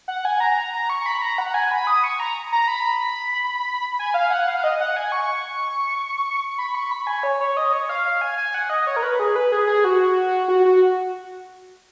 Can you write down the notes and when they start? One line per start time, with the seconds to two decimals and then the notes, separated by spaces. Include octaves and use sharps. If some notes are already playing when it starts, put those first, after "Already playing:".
0.08 F#5
0.25 G#5
0.40 A#5
0.58 A#5
0.74 A#5
0.90 C#6
1.06 B5
1.22 A#5
1.38 F#5
1.54 G#5
1.71 B5
1.87 D#6
2.04 C#6
2.20 A#5
2.52 A#5
2.68 B5
3.99 G#5
4.14 F5
4.31 F#5
4.48 F5
4.64 D#5
4.80 F#5
4.96 G#5
5.12 C#6
6.58 B5
6.75 C#6
6.91 B5
7.07 G#5
7.23 C#5
7.41 C#5
7.57 D#5
7.73 C#5
7.89 F5
8.06 F5
8.21 G#5
8.38 G#5
8.54 F#5
8.70 D#5
8.87 C#5
8.96 A#4
9.03 B4
9.19 G#4
9.36 B4
9.52 G#4
9.67 G#4
9.84 F#4
10.48 F#4
10.65 F#4